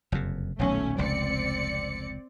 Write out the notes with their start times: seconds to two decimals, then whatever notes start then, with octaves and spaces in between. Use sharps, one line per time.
0.12 F#1 F2 C3
0.59 D#1 B1 F#3 A3 C#4
0.98 F1 C#2 C4 D5 C#7